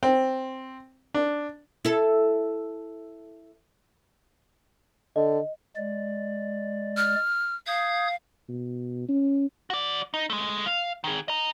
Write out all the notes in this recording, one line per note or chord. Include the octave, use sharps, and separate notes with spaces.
C4
D4
E4 A4
D3 D#5
G#3 D5
F6
F5 D#6 G6 G#6
B2
C#4
F#4 D5
D#4
G#3 A3
F5
D#3 G#4
D#5 A#5